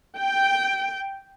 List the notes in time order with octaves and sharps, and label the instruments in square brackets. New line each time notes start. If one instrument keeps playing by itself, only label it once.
[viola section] G5